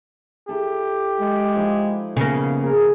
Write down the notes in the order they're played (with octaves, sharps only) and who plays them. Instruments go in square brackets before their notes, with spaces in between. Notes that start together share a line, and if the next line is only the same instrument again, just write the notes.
[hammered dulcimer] E4 A4 [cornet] G4
[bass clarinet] G#3
[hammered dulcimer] F3 D#4 E4
[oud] C#3 A#3 [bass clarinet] B3
[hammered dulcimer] G#4 [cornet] A#4